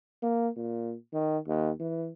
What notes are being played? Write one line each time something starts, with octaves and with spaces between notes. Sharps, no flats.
A#3
A#2
D#3
D#2
E3